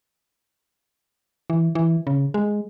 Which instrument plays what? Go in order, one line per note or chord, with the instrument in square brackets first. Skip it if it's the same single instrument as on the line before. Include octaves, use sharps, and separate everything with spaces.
[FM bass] E3
E3
C#3
G#3